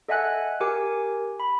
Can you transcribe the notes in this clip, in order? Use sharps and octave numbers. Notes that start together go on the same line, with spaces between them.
A4 D#5 E5 F#5 G#5 F#6
G4 A#4 G#5 D6
B5